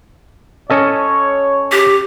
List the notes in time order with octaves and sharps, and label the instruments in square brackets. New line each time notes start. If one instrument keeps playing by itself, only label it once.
[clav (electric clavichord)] C#4 A4 D#5 [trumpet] C#5
[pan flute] G4